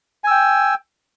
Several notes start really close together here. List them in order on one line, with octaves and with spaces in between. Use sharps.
G#5 E6 G5